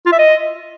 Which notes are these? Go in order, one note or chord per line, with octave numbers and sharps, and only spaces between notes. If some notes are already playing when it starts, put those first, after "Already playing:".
F4
E5
D#5